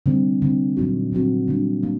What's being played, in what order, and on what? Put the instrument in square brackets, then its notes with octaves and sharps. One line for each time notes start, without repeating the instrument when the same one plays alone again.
[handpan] D3 G3 C4
D3 G3 C4
A#2 F#3 C4 D#4 F#4
A#2 F#3 C4 D#4 F#4
D3 G3 A#3 D4
A#3 D4